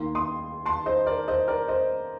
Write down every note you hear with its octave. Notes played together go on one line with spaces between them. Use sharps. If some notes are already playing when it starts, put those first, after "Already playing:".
Already playing: D#2 D#3 A#3 C6
C6 D#6
A5 C6
C5 D#5
A#4 D5
C5 D#5
A#4 D5
C5 D#5